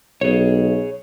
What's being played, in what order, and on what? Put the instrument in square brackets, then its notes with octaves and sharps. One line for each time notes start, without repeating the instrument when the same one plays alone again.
[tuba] B1 [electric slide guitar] G#4 C#5